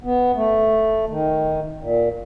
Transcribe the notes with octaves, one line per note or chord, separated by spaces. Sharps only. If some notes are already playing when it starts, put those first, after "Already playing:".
B3
A3
D#3
A#2